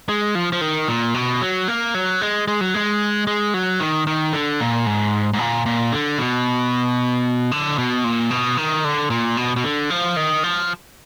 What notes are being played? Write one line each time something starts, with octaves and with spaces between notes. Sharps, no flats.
G#3
F3
F3
D#3
A#2
B2
F#3
A#3
F#3
G#3
G#3
F#3
G#3
G#3
F#3
D#3
D#3
D3
A#2
G#2
G#2
A#2
A#2
D3
B2
D3
B2
A#2
B2
D#3
D3
A#2
B2
B2
D3
F3
D#3
F3